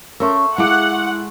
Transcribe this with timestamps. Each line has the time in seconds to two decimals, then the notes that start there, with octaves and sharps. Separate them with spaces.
0.20 A3 C#4 A#4 C6 E6
0.58 G#3 E4 F5 F#5 D6